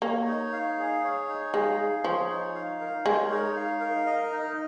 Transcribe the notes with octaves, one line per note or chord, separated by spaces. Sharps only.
A#3 C#5
D#4
F5
G#4
C#5
D#4
G#3 F5
G#4
F3 C#5
D#4
F5
A#4
G#3 C#5
D#4
F5
A#4
D#5
D#4